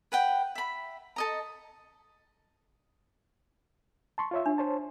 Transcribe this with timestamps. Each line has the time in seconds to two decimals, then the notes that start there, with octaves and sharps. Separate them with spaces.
0.12 B4 F#5 G5
0.55 E5 B5
1.16 A4 D#5 A#5
4.18 A5 C6 C#6
4.31 F4 C#5 E5
4.46 D4
4.58 C5 C#5 A5